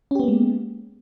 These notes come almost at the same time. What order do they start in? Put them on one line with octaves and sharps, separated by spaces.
C#4 G4 B3 A#3 G#3